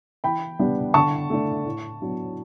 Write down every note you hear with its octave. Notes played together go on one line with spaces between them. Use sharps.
E3 G5 B5
G3 B3 D4
D3 A5 C#6
A3 D4
A2
F#3 B3 D4